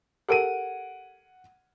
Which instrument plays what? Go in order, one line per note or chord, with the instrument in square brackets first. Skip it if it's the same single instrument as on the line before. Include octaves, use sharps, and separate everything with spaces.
[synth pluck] G4 A4 A#4 [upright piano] F#5 D7 D#7